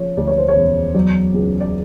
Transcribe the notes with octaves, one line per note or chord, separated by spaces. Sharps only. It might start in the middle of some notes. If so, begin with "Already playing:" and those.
Already playing: C#3 F3 C#5
D2 D5
C#5
C5
C#5
E1
F#3 D5
C#2
D5